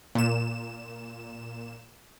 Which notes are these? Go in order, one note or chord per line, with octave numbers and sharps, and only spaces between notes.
A#2 E7